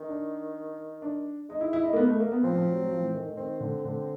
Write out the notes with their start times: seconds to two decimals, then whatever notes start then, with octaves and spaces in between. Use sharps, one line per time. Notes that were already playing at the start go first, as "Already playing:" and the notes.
Already playing: D#3
0.09 D4
1.02 D4
1.50 G#3 D#4
1.61 E4
1.73 E4
1.84 D#4
1.93 A#3
1.96 B3
2.08 A3
2.20 A#3
2.32 B3
2.43 F3 C4
2.55 F3
2.67 F#3
2.79 F#3
2.91 F3
3.02 E3
3.14 D#3
3.26 D#3
3.37 D#3 C4
3.60 D3
3.85 D3